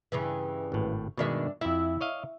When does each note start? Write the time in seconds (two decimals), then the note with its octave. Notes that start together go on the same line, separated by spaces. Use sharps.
0.12 G2 C#3 E3
0.72 G#1 A2
1.18 G2 B2 D#3 G#3 D4 E5
1.61 F2 E4 E5
2.01 C#5 D#5 F5